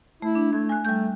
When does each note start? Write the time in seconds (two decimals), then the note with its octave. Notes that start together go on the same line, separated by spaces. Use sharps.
0.22 A3 E4
0.35 D4
0.53 A3 G#6
0.69 G#5 F#6
0.85 G3 A3 G6